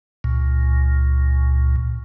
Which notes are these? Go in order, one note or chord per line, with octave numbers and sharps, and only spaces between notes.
C#2 A#2